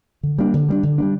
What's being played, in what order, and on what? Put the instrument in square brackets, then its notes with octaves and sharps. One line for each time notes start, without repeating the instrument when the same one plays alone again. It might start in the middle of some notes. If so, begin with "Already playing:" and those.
[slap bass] D3
G3 A#3 D4
D3
G3 A#3 D4
D3
G3 A#3 D4